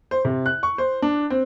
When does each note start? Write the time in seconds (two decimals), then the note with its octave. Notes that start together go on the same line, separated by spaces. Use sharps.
0.11 C5
0.25 C3
0.46 F#6
0.63 C#6
0.78 C5
1.02 D4
1.30 C4